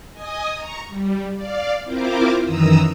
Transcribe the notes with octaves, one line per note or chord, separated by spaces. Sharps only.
D#5 G#5 D#6
A#5 C#6
G3
D5 F5
C4 E4 F4 A#4 C5 D6
F#2 D#3 E3 A#5 D#6 E6